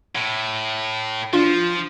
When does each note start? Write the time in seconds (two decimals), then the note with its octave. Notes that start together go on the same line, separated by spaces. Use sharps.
0.15 A2
1.33 F3 D4 F4